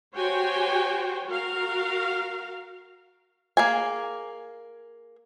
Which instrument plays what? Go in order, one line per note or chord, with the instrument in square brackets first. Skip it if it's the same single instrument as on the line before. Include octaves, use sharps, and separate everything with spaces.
[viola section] F#4 G4 C5 C#5 G5 G#5
F#4 A#4 F5
[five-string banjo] A#3 G#4 G#5